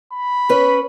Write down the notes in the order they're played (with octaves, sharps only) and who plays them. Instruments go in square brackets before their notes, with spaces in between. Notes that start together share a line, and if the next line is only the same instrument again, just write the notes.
[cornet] B5
[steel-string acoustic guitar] C#4 B4